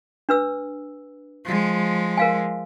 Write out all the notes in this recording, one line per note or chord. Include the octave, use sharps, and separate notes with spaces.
D4 B4 E6
F3 G#3
A#4 F5 G#5